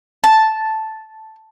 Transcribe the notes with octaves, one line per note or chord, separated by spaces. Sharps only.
A5